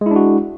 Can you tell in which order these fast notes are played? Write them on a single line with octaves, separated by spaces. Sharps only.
G#3 E4 D4 F#4